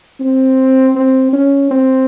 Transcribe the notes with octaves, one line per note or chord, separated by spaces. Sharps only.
C4
C4
C#4
C4